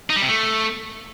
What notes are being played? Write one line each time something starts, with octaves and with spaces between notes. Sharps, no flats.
D#4
G3
C3
A3